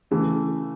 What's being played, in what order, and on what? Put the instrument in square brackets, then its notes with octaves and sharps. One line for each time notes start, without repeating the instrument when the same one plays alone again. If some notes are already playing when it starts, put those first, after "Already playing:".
[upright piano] C#3 E3 A3